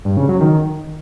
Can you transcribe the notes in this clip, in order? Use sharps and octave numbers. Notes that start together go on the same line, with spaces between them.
G2
C#3
F#3
D#3